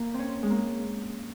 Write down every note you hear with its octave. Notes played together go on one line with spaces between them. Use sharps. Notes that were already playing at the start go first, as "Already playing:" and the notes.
Already playing: A#3
C4 C#4
G#3
A#3